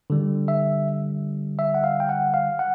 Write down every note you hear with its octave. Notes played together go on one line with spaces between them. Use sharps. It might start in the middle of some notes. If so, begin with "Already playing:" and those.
D3 G3
E5
E5
F#5
F5
G5
F#5
F5
F#5